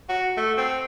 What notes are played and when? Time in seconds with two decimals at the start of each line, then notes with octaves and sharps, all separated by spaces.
0.09 F#4
0.37 A3
0.58 C4